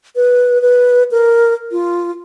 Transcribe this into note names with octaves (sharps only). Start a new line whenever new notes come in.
B4
B4
A#4
F4